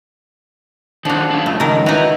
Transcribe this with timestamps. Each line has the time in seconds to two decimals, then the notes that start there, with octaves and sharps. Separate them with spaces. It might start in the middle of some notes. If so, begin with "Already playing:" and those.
1.05 D#3 F3 D4 F#4
1.30 D4 F5
1.46 C2 F2 A3
1.60 C#2 D#3 A#4
1.86 D#4 F#4 B4 E5